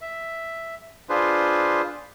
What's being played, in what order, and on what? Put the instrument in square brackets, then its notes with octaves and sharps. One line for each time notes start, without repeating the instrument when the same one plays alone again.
[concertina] E5
D4 F4 G#4 B4 C5